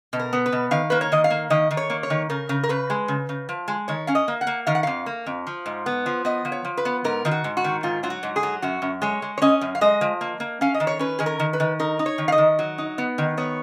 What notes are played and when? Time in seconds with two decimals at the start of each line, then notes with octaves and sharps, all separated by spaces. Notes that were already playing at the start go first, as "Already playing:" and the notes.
0.13 B2
0.20 A#4
0.33 B3
0.46 B4
0.52 B2
0.71 D#3 F5
0.90 A#3 B4
1.01 C#5
1.12 D#3 D#5
1.24 F5
1.30 A#3
1.50 D#3 D#5
1.71 D#3
1.77 C#5
1.90 A#3
2.03 C#5
2.10 D#3
2.30 C#3 A#4
2.49 C#3
2.63 A#4
2.69 C#3 B4
2.90 G#3
3.08 C#3
3.29 C#3
3.49 F3
3.68 G#3
3.88 D#3 C#5
4.07 C#4 F5
4.15 D#5
4.28 A#3
4.41 F#5
4.47 A#3
4.67 D#3 F5
4.75 F#5
4.83 F2 F5
5.06 A#3
5.26 F2
5.47 F3
5.66 G#2
5.86 B3
6.06 F3
6.25 B3 D#5
6.45 F3
6.52 C#5
6.65 F3
6.77 B4
6.85 B3
7.04 G#2 A#4
7.25 D#3 F4
7.31 F#4
7.44 G#2
7.57 F#4
7.64 D#3
7.83 G#2 F4
8.03 F#3 F4
8.10 F#4
8.23 G#2
8.36 G#4
8.43 F#3
8.62 F#2 F#4
8.82 F#2
9.02 G#3 C#5
9.22 G#3
9.38 C#5
9.42 C#4 D#5
9.61 F#2
9.75 F5
9.81 G#3 D#5
10.01 F3
10.21 A#3
10.40 A#3
10.61 C#4 F5
10.74 D#5
10.80 D#3
10.87 C#5
10.99 C#4 B4
11.19 D#3 G#4
11.26 A#4
11.40 D#3
11.53 B4
11.60 D#3
11.80 D#4 A#4
11.99 D#4
12.06 C#5
12.18 D#3
12.28 F5
12.32 D#5
12.38 D#3
12.59 F#3
12.78 D#4
12.98 B3
13.18 D#3
13.38 B3 C#5